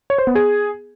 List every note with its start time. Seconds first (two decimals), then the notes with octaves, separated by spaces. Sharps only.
0.10 C#5
0.18 C5
0.27 B3
0.35 G#4